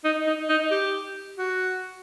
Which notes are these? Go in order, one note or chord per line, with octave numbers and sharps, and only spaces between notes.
D#4
D#4
D#4
G4
F#4